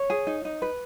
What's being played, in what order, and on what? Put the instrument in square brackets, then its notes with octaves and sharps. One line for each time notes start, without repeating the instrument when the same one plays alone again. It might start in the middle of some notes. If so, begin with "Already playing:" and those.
Already playing: [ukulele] C#5
G#4
D#4
D#4
B4